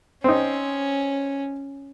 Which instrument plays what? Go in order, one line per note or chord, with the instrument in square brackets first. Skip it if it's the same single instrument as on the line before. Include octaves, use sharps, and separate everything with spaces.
[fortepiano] C4 D#4 [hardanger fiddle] C#4